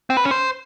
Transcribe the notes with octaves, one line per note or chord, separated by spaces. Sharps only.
C4
B4
C#4
C5